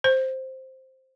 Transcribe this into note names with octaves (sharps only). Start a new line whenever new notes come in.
C5